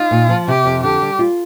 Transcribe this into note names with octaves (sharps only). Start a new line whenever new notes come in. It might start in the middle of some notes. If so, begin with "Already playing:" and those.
Already playing: D#4 F4
A#2
F3
C3 G4
F2
D3 G4
G3
F4